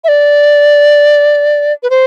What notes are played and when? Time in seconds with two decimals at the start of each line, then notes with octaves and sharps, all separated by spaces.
0.04 E5
0.08 D5
1.83 B4
1.90 C5